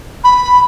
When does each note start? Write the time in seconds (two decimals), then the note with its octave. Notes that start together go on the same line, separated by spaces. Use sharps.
0.24 B5